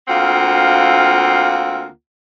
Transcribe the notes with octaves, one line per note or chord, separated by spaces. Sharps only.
D2 A#3 C4 F4 F#5